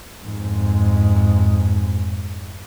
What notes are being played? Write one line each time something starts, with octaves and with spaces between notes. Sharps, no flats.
F2 G#2